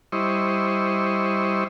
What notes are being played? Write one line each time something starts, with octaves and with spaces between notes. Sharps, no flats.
G3 E4 C5 D#5 C#6